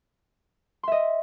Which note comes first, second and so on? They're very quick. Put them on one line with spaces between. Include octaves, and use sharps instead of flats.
C6 E5 D#5